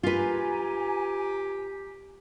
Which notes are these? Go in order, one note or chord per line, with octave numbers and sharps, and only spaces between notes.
F4 G4 B4 G#5 A#5